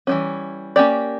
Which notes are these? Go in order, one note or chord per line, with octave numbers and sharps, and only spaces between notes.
E3 G3 C#4
A#3 C#4 G4 D5